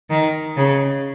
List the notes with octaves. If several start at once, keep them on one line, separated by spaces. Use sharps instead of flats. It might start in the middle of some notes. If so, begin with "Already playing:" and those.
D#3
C#3